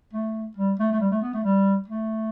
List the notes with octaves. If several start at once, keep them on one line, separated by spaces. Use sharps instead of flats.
A3
G3
A3
A3
G3
A3
B3
A3
G3
A3